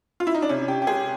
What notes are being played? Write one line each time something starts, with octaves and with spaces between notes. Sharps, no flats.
F4
E4
D#4
D4
C3 C#4
G4
G4
G#3 G#4